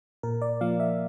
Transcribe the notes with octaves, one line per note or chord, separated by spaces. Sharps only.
A#2 A#4
D5
F3 A#3 F5
E5